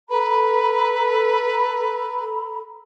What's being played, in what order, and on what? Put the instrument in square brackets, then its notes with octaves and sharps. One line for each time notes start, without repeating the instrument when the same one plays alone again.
[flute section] A4 A#5 B5 [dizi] B4